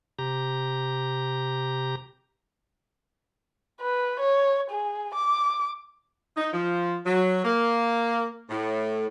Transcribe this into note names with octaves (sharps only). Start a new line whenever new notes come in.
C3 G4 A#5
B4
C#5
G#4
D6
D#4
F3
F#3
A#3
A2